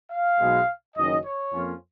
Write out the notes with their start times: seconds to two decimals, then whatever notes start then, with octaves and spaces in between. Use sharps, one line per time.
0.11 F5
0.40 B1 B2 G#3
0.97 F#1 F#2 D#3 F#3 C#4 D#5
1.25 C#5
1.53 F2 F3 A#3 C#4 F4